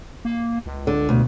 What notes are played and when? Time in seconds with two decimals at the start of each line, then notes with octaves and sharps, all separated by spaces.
0.25 A#3
0.66 C#2
0.87 D3
1.09 D2 B2